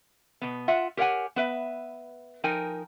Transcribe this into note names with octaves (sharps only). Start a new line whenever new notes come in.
B2 B3
F4 E5 F#5
G4 A#4 C#5 F5 F#5 G#5
B3 B4 E5
F3 D#4 A#4 G5 G#5